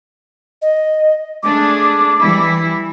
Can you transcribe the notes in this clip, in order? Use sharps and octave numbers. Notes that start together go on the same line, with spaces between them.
D#5
A3 D4 G#4 D6
E3 G3 E4